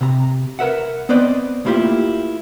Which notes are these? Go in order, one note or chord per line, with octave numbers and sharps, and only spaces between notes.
C3 A#5
A#4 B4 E5 F#5
B3 C4 B4 C5 D5 D#5
A3 A#3 E4 F4 G4